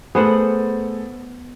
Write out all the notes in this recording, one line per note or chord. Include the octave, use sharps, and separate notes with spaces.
A3 B3 G#4 C5 F#5